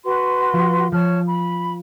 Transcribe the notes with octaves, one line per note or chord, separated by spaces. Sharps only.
F#4 B4 C6
F3 F4 E7
F3 C#5 A5 F6
B5